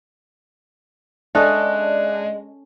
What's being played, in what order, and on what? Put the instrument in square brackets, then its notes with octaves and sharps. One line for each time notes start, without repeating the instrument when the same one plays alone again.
[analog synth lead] G#3 [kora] C#4 A4 D#5 [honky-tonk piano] D4 [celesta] E5 F#6